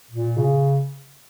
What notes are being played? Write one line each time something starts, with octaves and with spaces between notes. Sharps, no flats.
A#2
C#3